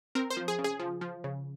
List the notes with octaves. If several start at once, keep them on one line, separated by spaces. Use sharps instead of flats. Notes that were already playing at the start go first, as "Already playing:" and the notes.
C4 A#4
C5
F3
G#4
C#3
G#4
F3
F3
C#3